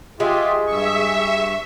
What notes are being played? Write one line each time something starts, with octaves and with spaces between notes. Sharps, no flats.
G#3 F4 G4 G#4 E5
G2 E5 C#6